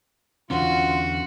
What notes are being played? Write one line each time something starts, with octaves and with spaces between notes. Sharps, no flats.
E2 D3 C#4 F4 F#4